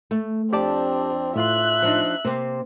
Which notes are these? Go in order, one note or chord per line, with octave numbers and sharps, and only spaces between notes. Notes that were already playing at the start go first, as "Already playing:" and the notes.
A3
F2 C4 D4 G4 D5 A5
A2 F4 E5 C6 F#6
F3 D4 D#4
C3 A#3 C4